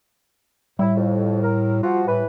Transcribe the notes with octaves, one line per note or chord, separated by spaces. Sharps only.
A2 G3 E4
F2
A#4
F3 F4 F#4
A2 E3 B4